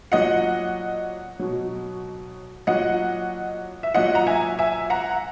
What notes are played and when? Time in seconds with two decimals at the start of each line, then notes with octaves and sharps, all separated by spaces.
0.12 A#2 F#3 D#5 F#5
1.39 B2 F#3
2.67 A#2 F#3 D#5 F#5
3.83 E5
3.94 A#2 F#3 D#5 F#5
4.15 A#5
4.27 E5 G#5
4.59 E5 G#5
4.90 F#5 A#5